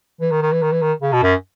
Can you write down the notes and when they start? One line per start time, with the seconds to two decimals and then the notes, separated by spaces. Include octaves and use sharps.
0.21 E3
0.31 D#3
0.42 D#3
0.52 E3
0.62 D#3
0.72 E3
0.82 D#3
1.02 C#3
1.13 B2
1.23 F#2